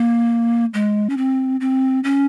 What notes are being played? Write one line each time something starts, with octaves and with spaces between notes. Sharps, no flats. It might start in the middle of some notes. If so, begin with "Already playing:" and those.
Already playing: A#3
G#3
C#4
C4
C4
C#4